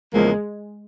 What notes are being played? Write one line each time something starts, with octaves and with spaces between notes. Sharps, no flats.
E2 C#3 F3 G#3 A#3